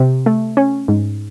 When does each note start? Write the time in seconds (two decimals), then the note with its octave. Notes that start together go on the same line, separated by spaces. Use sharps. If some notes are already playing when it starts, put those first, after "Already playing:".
Already playing: C3
0.26 A3
0.57 C#4
0.88 G#2